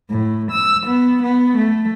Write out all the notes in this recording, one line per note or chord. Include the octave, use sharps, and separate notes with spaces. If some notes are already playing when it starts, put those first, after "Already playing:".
A2
E6
B3
B3
A3